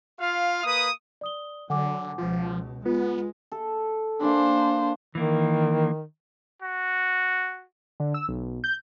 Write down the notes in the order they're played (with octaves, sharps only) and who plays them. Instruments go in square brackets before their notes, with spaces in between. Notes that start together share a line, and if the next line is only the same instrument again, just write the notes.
[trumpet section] F4 F5
A#3 B4 D#6
[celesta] D5 D#6 G7
[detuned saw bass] D3 [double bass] F#3 [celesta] F#5 G#5 D6
[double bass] C#2 B2 [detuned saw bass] F3
[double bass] G#3 [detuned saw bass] B3 [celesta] F4 B4
[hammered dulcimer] A4
[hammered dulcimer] A#3 G#5 B5 [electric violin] D4 C5
[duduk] D#3 [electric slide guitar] E3 A#3
[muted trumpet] F#4
[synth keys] D3
E6
B1
G6